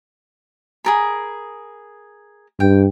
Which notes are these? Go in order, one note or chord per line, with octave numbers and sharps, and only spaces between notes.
G#4 A#4 B5
G2 G5